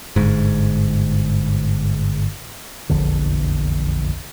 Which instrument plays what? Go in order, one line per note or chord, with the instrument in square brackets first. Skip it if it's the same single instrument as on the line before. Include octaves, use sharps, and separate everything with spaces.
[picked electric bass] G1 G#2
[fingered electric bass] F1 A#1 E2 D3